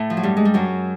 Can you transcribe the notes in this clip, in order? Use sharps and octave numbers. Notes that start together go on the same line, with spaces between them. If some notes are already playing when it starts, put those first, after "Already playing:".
Already playing: A2 A3
F3
F#3
G2 G3
G#3
G3
F#2 F#3